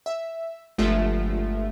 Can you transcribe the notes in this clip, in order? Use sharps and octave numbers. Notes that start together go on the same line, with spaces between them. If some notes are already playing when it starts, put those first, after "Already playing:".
E5
G1 F3 G#3 A3 F4 E5